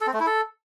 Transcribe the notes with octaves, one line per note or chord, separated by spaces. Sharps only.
A4
C4
A3
E4
A4